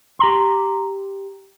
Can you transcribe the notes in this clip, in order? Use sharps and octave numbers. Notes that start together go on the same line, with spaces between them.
G4 A#5 C6